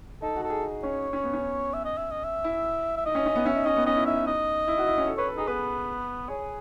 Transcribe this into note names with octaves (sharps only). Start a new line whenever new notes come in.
D#4 A4
F#4
A4
G#4
D#4
C#4 C#5
C#4
B3
C#4
E5
D#5
E5
D#5
E5
E4
E5
D#4 D#5
C#4
C#4
B3
C#4 E5
D#4
C#4 D#5
B3
C#4 D#5
E4
D#4 E5
D#4
D#5
E4
F#4
E4
C#4
A4
B4 C#5
A4
D#4 G#4
B3 B4
G#4 C#5